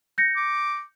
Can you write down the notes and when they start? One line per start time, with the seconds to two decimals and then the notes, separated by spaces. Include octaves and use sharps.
0.18 G6 A#6 C#7
0.36 D6